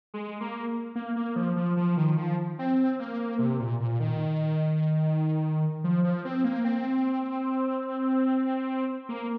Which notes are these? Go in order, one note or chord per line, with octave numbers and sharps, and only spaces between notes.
G#3
A#3
A#3
A#3
F3
F3
F3
D#3
F3
C4
A#3
C3
A#2
A#2
D#3
F3
F3
C4
A#3
C4
A#3